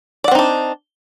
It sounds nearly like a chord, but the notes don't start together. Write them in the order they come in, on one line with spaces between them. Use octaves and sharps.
D5 F#5 C4 D#4 D4